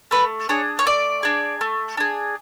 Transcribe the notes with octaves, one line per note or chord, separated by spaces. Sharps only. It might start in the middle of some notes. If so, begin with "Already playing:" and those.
A3 B4
D4 G#4 C#5
C#5
A3 D5
D4 G#4
A3
D4 G#4